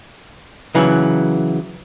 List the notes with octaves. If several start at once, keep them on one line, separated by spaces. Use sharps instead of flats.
C#3 E3 F#3